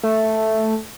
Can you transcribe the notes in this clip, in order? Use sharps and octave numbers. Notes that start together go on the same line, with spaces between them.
A3